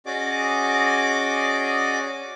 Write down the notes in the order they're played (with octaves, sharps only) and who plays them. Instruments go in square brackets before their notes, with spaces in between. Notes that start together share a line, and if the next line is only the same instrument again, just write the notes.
[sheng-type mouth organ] C#4 F#4 G#4 D5 D#5 D6